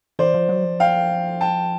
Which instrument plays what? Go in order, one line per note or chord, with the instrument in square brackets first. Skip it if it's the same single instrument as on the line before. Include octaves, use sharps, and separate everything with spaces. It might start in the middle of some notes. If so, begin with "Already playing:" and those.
[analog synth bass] E3 [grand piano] C5 D5
[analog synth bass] F3
F#3
F3
[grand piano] F5 G5
G5 A5